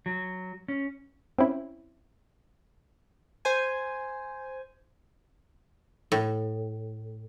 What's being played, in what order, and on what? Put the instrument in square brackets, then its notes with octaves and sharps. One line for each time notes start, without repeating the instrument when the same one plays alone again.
[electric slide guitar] F#3
C#4
[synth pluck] C4 C#4 E4
[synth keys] C5 G#5
[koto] A2